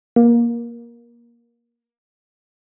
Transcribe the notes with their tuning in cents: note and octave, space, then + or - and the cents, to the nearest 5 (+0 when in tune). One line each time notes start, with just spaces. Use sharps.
A#3 +20